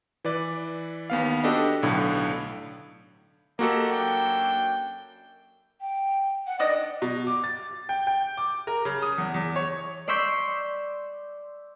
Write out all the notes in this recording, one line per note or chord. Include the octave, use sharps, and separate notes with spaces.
E3 B4 D5
D#2 B3 F5
D4 F#4 G4 A4 B4 D#5
B1 A2 D3
A#3 F#4 G4 A4 D#5 F#5
F#2 D4 G5
G5
F#5
D#3 D4 D5 D#5
B2
D6
A6
G5
G5
D6
A#4
C#3
D#6
E2
E2
C#5
D5 C6 C#6 E6 G6 B6